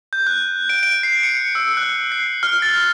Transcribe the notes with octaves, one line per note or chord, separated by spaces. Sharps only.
G6
F#6
D7
D7
C7
C#7
E6
F#6
C7
F6
A6